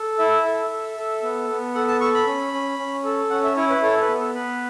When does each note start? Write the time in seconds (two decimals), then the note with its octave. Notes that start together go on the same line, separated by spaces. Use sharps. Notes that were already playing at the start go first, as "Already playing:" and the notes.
Already playing: A4
0.19 E4 E5
0.45 A4
0.70 A4
0.97 A4
1.23 B3
1.49 B3
1.74 A4 F#5
1.88 A5
2.00 A4 C#6
2.14 B5
2.27 C#4
2.53 C#4
2.79 C#4
3.04 A4
3.30 C#4 F#5
3.44 E5
3.56 E4 C#5
3.70 B4
3.82 A4 C#5
4.01 B4
4.08 B3
4.18 A4
4.35 B3 B4